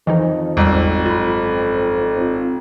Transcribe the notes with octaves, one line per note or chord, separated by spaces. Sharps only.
F2 D#3 E3 D#4 D#5
G#1 E2 G3 E6
F#2 F4 B5
C4 F4